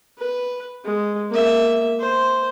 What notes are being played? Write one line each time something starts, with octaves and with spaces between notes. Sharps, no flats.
B4
G#3
A#3 E5
C5